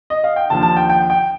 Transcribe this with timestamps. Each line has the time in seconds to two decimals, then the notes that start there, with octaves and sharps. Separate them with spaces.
0.10 D#5
0.24 F5
0.36 G5
0.50 D#2 D3 F3 A5
0.63 A5
0.77 G5
0.90 G5
1.10 G5